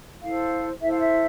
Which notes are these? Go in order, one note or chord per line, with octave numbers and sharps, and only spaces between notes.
E4 A4 C5 F5
E4 A4 C5 E5
F5
E5